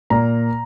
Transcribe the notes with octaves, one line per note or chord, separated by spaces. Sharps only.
A#2 A#3 A#5